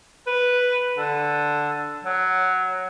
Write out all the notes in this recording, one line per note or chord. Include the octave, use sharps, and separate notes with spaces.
B4
D3
F#3